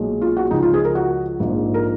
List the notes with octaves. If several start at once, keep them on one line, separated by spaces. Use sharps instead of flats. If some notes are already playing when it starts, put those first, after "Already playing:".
Already playing: B1 A#2 G#3
F4
F#4
C#2 C#3 F3 D#4
F4
G#4
A#4
F#4
A#1 G#2 F3 A#3
A#4